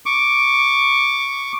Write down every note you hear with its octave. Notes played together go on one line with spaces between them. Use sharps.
C#6 D6